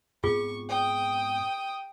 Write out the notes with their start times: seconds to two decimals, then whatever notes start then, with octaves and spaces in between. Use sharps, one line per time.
0.24 G#2 B3 C4 F4 G#4 C#6
0.69 G5 D#6